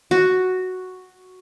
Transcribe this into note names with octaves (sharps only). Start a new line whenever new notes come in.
F#4